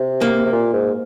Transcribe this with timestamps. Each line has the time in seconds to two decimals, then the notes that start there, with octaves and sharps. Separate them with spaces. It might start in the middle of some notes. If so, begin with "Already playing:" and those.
Already playing: C3
0.21 A#3
0.45 C3
0.53 A#2
0.73 G#2